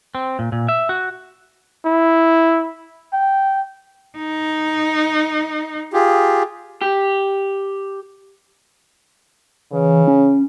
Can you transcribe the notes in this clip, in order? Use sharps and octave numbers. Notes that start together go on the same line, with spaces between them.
C4
A#2
A#2
E5
F#4
E4
G5
D#4
F4 G4 G#4
G4
C#3 E3
C#4